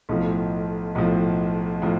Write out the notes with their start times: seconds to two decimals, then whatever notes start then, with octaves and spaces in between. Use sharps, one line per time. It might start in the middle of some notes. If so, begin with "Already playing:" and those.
0.09 B1 A2 F3
0.95 B1 A2 F3
1.82 A2 F3